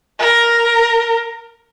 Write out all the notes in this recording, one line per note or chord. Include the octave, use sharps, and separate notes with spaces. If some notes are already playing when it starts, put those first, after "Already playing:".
A#4